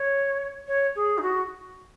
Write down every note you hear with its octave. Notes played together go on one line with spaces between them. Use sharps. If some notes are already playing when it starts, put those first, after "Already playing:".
Already playing: C#5
C#5
G#4
D#4
F#4